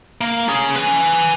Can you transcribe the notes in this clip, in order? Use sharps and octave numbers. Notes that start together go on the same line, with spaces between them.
A#3
C#4 G#4
B4 G#5